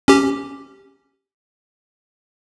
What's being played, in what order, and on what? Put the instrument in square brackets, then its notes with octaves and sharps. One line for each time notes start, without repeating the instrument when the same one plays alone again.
[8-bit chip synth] C#4 G4